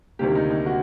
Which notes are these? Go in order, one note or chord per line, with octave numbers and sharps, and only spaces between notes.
D2 C3 D#3 G3 A#3 G4
D#4
D#4
F#4